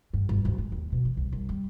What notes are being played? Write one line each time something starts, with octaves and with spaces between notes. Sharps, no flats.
G2
G1
D1
G#3
D#2
B2
E3
C2
C2
G3